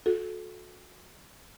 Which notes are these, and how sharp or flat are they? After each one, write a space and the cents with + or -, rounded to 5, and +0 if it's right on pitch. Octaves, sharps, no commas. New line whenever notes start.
F#4 -35 A4 -20